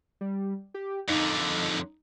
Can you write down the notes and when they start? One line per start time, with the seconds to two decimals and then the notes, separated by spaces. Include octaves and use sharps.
0.21 G3
0.74 G4
1.09 F2 D3 D#4